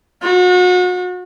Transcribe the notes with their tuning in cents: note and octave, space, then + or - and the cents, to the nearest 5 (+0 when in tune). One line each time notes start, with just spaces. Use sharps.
F#4 -35